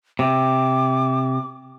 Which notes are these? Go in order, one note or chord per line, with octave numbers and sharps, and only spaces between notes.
C3 D6